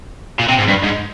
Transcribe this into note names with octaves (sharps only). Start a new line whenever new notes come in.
A#2
C3
G#2
G2
G#2